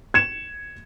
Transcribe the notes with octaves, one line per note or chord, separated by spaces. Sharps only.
G#6 C#7 E7